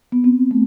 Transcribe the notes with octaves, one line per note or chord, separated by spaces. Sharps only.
B3
C4
A3